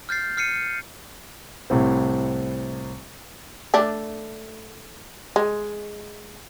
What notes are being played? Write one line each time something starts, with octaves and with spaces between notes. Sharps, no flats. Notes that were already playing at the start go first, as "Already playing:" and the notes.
F6 G6 A6 C7
F6 C7 C#7 D#7
C2 A2 C4
A3 D4
G#3